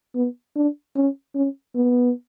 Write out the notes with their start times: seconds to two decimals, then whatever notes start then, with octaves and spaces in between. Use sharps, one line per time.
0.15 B3
0.56 D4
0.96 C#4
1.35 C#4
1.75 B3